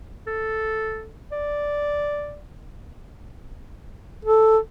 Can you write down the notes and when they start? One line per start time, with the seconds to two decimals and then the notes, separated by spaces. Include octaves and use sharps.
0.27 A4
1.32 D5
4.25 A4